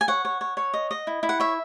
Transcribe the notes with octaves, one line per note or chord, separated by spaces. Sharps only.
G#5
C#5 F#5
C#5
C#5
C#5
D#5
D#5
E4
E4
F#5
C#5 E5